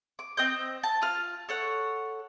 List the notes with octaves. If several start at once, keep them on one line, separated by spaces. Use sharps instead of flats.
D6
C4 D#5 G6
A5
F4 F6
A4 C#5 F#5